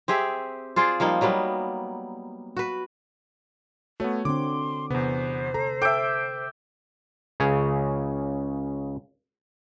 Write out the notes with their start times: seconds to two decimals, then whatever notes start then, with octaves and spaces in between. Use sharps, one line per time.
0.08 C4 G4 G#4 E5
0.76 F4 G#4 C5 D5
1.00 F3 G3 A#3 D#4
1.21 F#3 G3 A#3 B3
2.57 F#4 B4
4.00 A3 B3 F#4 C#5
4.25 D3 C4 C6 D6
4.91 E2 C3 B3 C5
5.54 A4 A#5
5.82 A4 E5 G5 D6 D7
7.40 C#2 C#3 G#4 C#5